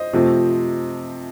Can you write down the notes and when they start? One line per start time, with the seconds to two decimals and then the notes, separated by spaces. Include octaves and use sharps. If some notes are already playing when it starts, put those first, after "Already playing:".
Already playing: C5 D#5
0.13 C3 F3 A3 C4